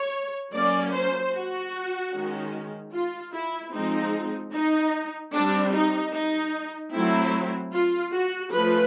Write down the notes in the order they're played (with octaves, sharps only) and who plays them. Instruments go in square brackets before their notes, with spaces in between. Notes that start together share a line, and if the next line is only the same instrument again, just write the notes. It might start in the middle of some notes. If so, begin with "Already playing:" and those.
Already playing: [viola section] C#5
F#3 A#3 C#4 D5
C5
F#4
D#3 G#3 C#4
F4
E4
F3 G#3 C4 D#4
D#4
G3 C4 D4
D#4
D#4
F#3 A3 C4 E4
F4
F#4
F3 A3 C#4 B4